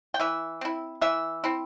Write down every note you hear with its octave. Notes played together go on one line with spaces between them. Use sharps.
G5
E3 E5
C4 E4
E3 E5
C4 E4